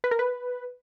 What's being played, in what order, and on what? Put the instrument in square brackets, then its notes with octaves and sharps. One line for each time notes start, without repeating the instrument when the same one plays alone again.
[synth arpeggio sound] B4
A#4
B4